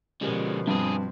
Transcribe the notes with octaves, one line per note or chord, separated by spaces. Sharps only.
B2 D3 F3 G#3 C#4 G4 A#4
G2 D3 C4 G#4 C6